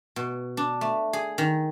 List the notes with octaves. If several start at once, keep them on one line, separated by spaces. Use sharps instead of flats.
B2
D4
A3
G#4
D#3